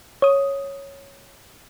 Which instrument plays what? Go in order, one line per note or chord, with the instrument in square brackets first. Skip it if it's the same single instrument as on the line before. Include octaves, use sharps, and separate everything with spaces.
[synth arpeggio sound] C#5 D#6